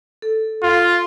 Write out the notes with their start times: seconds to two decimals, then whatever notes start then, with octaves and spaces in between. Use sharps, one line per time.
0.22 A4
0.63 F4